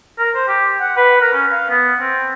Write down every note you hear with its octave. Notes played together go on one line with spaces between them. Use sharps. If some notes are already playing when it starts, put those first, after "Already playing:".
A#4
C5
G4
F#5
B4
A#4
C#4
F5
B3
C4